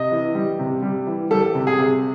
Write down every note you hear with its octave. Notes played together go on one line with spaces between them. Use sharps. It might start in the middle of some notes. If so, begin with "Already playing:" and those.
Already playing: C3 D#5
E3
G3
C3
G3
E3
G3 A4
C3
G#4
C3